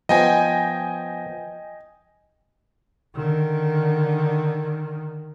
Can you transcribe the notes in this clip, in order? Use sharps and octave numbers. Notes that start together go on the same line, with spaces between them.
F3 B3 D#5 G5 G#5
D3 D#3